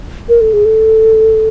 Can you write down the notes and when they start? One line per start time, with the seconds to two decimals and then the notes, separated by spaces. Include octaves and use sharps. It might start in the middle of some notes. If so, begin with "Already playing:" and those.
0.29 A#4
0.41 A4
0.53 G#4
0.65 A4